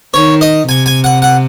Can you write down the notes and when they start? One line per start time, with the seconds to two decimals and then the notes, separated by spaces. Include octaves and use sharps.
0.14 D#3 C#5
0.41 D#5
0.68 C3 G#5
0.86 G#5
1.04 F#5
1.22 F#5